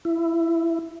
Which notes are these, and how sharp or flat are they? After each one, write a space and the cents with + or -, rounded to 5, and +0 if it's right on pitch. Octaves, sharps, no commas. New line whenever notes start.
E4 +15